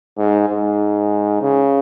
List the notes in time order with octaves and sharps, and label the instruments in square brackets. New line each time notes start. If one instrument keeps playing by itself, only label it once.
[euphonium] G#2
G#2
C#3